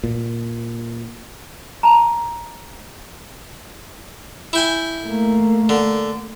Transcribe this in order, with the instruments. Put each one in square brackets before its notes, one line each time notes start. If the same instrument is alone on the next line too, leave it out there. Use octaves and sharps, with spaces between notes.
[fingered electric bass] A#2
[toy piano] A5 A#5
[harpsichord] E4 G5 G#5
[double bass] A3 A#3
[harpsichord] D3